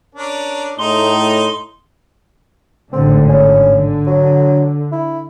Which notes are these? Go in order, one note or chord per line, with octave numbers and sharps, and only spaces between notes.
C#4 D4 A#4
A2 D#4 G#4 A#5 C6
G#1 A2 D3 C4
C#4
D3
F#3
E4